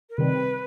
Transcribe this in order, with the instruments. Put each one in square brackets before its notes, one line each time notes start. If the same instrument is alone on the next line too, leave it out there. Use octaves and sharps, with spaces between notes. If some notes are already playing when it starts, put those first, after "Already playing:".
[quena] A#4
[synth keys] C3 D#3 G3 C4 [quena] B4